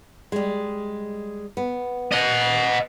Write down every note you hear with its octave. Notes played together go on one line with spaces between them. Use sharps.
G3 G#3
B3
D#5 F#5